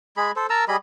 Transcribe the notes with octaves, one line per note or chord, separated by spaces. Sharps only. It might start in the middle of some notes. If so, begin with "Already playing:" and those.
G#3 G#4 B5
A4 C5
A#4 A5 A#5 E6
G3 G#4 D#5 B5